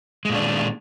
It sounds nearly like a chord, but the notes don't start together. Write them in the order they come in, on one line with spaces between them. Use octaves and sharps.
G#3 A#2 D4 D#3